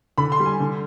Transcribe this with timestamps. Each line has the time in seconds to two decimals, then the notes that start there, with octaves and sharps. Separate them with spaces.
0.18 D3 B5
0.32 C6
0.40 G3
0.46 G#5
0.60 D3